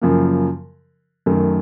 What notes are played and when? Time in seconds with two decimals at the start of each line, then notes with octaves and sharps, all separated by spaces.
0.01 F#2 C#3 F3 A#3
1.26 F#2 D#3 A3